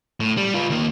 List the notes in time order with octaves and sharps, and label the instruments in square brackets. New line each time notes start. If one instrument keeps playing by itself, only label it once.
[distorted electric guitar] A2
G3
F4 B4
D#2 A#3